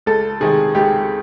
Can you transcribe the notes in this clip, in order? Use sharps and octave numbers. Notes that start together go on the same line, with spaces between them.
C#2 A4
C3 D#3 G#3 G#4
C#2 G4